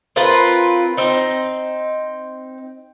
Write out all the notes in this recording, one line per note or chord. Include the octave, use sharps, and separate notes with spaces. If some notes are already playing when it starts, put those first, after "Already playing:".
C4 F4 A#4 B4
C4 D#4